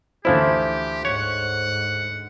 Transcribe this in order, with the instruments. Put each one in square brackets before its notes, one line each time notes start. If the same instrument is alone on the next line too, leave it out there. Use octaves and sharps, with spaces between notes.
[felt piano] D2 C5 [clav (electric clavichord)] E3 F3 E4 [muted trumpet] G4
[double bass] G#2 [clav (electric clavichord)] C#5 [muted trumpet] F#5